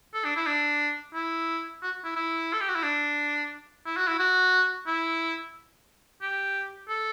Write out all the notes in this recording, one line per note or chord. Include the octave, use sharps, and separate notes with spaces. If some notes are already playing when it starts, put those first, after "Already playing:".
A4
D4
E4
D4
E4
F#4
E4
E4
A4
G4
F#4
E4
D4
E4
F#4
E4
F#4
E4
G4
A4